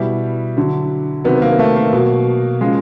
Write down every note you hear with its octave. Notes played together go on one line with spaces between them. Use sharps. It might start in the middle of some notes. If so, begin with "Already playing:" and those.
Already playing: B2 G3 E4
D3 F#3
C3 D#3 F#3 B3
A#3
A3
A#3
B2 F#3
C#3 F3 G#3